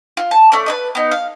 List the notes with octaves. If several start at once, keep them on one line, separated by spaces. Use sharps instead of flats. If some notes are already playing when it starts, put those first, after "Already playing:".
F4
A5
A3 C#4 D5
B4 D5 D#5
B3 D#4
F5